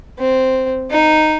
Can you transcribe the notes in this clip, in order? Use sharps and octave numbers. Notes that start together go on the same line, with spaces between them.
C4
D#4